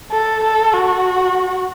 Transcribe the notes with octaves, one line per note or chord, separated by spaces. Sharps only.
A4
A4
F#4